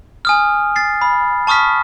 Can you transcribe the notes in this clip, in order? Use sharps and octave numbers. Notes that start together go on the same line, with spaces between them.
G#5 D#6 F6
A6 C7
B5
A5 C#6 D#6 F6 B6